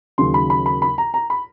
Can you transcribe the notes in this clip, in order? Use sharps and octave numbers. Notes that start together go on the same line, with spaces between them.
D#2 C#3 F#3 C6
B5
B5
B5
B5
A#5
A#5
B5